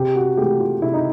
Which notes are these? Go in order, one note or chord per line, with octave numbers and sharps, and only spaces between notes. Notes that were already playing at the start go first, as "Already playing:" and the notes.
Already playing: C3 G4
F#4
E3 A3 G4
F4
C3 E4
D#4